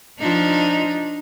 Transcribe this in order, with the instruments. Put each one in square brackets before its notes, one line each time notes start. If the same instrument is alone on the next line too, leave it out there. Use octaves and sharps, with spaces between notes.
[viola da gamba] F3 D4 D#4